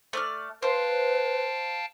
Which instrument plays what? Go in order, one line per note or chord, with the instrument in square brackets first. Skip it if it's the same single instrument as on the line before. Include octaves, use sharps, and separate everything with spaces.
[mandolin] A3 D5 F6
[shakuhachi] B4 [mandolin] C5 [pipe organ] F5 G5 A5